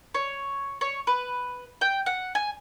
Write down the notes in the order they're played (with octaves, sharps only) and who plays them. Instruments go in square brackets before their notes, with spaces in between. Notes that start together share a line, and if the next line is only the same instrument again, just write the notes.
[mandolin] C#5
C#5
B4
G5
F#5
G#5